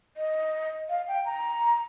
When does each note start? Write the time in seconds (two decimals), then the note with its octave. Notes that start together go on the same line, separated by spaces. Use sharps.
0.17 D#5
0.89 F5
1.08 G5
1.25 A#5